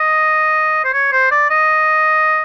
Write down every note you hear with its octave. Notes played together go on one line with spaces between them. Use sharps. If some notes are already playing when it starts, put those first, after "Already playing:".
Already playing: D#5
C5
C#5
C5
D5
D#5